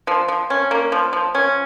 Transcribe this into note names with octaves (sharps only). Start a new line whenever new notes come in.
F3
F3
C#4
A#3
F3
F3
C#4